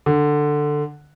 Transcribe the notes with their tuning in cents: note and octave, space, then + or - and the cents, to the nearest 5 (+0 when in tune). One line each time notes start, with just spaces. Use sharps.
D3 +10